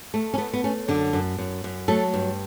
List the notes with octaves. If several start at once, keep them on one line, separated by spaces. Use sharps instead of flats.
A3
C#4
A3 B3
B3
A3 C#4
F#2 D3 D4
F#2
F#2
F#2
F#3 A3 A4
G2